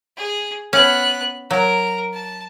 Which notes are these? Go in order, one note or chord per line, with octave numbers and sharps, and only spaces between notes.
G#4
B3 C#4 F#6
F#3 A#4
A5